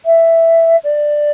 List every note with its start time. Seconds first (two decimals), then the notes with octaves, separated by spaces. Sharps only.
0.05 E5
0.84 D5